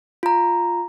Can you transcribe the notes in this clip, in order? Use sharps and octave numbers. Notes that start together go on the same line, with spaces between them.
F4 A#5